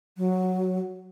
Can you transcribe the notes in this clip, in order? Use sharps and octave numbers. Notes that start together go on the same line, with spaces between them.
F#3